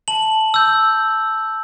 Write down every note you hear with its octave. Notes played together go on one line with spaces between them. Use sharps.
A5 F#7
E6 G6